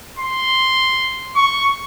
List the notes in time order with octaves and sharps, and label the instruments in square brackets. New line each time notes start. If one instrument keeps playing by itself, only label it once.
[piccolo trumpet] C6
C#6